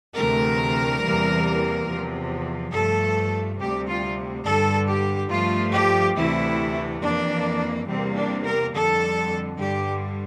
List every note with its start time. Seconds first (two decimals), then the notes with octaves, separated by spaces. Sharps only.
0.16 D2 C3 E3 A3 A#4
1.02 E2 C3 E3 G3 A#3
1.88 E2 C3 F3
2.73 G2 F3 A3 A4
3.59 D2 C3 G3 G4
3.87 F4
4.44 G2 D3 G3 A4
4.87 G4
5.30 G2 F3 A3 F4
5.73 G4
6.15 D2 C3 E3 A3 E4
7.01 F2 E3 A#3 D4
7.87 E2 C3 G3 A#3 C4
8.15 D4
8.44 A#4
8.72 F2 D3 G3 A4
9.57 G2 D3 G3 G4